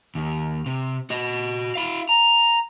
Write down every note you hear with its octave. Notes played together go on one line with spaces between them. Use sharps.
D#2
C3
F#4 D#5
E4 F5
A#5